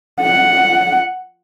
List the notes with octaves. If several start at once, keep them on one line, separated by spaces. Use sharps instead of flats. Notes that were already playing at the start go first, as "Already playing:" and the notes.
F#5